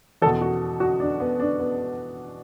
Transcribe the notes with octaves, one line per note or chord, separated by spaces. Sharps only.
E2 B2 A4
F#4
F#4
D4
B3
D4
B3